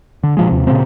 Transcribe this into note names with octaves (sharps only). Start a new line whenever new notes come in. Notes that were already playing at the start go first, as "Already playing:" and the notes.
D3
A#2 F3 G#3
D#2 C3
A#2 C#3 C4